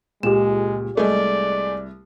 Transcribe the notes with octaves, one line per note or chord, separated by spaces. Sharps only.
C#2 A#2 G#3 G4 E7
C2 G#3 A3 D5